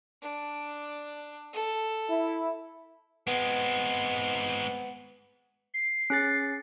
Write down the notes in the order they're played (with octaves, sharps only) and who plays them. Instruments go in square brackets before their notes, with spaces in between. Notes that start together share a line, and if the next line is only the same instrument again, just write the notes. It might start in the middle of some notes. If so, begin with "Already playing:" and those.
[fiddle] D4
A4
[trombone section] E4
[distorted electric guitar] G#3 C4 [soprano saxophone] B3
[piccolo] C7
[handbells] C#4 G#4 A6